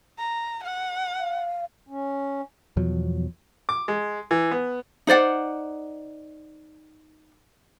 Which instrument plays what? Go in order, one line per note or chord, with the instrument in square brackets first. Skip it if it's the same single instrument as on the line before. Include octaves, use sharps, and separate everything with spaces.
[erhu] A#5
F#5
[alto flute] F5
[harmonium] C#4
[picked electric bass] E2 B2 F3 F#3
[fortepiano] D6
G#3
E3
B3
[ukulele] D#4 C5 D5 F#5